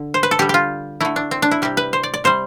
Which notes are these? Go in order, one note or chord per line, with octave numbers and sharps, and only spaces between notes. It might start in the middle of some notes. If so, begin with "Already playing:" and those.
Already playing: D3
C5
B4
A4
D3 G3 G4
F4 G4
D3 A3 E4
D4
C4
D4
E4
C3 G3 G4
B4
C5
D5
D5
C3 G3 C5